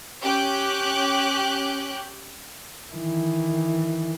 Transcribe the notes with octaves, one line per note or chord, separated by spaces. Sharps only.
C#4 G4 G5 D6 F#6 G6
D#3 E3